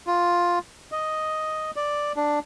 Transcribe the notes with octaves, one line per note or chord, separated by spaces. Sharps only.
F4
D#5
D5
D4